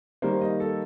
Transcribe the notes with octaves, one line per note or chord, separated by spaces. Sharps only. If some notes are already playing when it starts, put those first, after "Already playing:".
D#3 G3 A#3 C5
D#5
A4